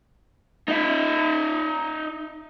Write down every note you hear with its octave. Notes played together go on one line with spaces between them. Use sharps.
D#4 E5